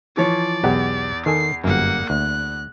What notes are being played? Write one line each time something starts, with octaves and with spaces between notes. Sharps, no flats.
E3 F3 C#5 D5
B1 E2 G4 F#5
D#3 A4 G#5 C7
G1 F#2 A#3 F#5
D2 F#6